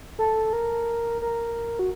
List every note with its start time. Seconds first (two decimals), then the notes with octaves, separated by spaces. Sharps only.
0.19 A4
0.53 A#4
1.22 A#4
1.79 F#4